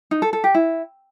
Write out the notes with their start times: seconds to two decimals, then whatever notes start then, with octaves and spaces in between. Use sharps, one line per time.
0.11 D#4
0.22 A4
0.33 A4
0.44 G4
0.55 E4